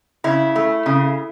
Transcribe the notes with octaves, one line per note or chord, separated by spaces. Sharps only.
C#3 E4
A3
C#3